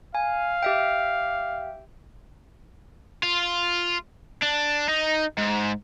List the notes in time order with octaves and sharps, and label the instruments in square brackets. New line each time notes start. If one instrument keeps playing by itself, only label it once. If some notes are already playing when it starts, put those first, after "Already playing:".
[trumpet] F5 [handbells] G#5
[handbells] G4 E5 G5
[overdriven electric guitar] F4
D4
D#4
G#2